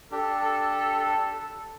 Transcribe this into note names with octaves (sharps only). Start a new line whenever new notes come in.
D4 G4 A4